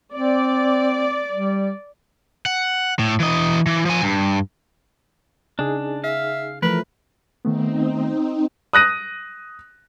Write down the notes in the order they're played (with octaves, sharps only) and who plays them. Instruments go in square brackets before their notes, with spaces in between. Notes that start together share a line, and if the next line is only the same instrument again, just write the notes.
[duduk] C4 [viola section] D5
[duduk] G3
[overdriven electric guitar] F#5
A2
E3 D#5
E3
F3 G#5
G2
[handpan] C#3 [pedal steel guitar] D4 [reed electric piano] D#4 G#4
[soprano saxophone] E5 [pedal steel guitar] F5
[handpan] E3 F3 A3 [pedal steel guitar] A#4 [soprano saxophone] B4
[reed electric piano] D#3 A3 B3 [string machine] C4 D#4
[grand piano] D#6 F#6 A#6 D#7